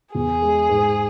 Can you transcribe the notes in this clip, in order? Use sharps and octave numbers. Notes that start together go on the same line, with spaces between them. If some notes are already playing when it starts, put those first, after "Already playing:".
E2 G#4
G#3
G#2